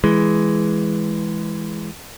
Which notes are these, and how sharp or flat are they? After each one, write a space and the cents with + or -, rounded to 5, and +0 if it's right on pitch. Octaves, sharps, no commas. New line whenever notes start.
E3 +0 G#3 +0